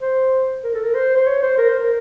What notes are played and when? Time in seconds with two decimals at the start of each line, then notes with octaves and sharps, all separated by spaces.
0.01 C5
0.64 A#4
0.74 A4
0.84 A#4
0.95 C5
1.16 C5
1.26 C#5
1.42 C5
1.58 A#4
1.69 C5
1.80 A#4